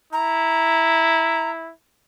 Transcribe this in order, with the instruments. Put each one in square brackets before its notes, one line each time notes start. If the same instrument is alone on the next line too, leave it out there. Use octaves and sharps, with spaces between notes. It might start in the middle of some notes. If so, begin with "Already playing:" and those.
[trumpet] E4 [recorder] A#5